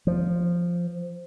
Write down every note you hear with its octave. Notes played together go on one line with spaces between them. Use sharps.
F3